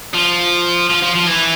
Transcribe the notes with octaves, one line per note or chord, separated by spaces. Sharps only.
F3
F3
F3
F3
E3